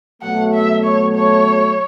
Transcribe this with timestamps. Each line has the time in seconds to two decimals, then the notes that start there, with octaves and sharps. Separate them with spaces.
0.22 B2 F#3 A3 F#5
0.53 E5
0.84 C#5
1.15 C#5